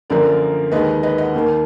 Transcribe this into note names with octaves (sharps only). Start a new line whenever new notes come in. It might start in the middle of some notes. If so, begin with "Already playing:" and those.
F#2 D3 F3 A#3 A#4 D5
D#2 D#3 G#3 B4 D#5
B4 D#5
D#5 F#5
D#2 D#3 A#3